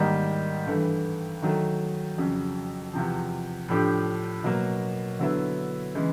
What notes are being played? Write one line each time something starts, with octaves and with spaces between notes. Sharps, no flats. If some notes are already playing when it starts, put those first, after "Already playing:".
Already playing: G#2 D#3 G3 A#3 D#4
G2 E3 A3
D#3 F#3 A3
F2 C#3 F#3
E2 C3 F3
A2 F3 A3 D4 G4
B2 F#3 A#3
D3 F#3 B3 E4
C#3 E3 G#3